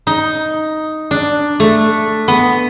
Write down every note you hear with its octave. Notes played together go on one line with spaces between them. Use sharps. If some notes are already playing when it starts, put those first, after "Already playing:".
D#4
D4
A3
B3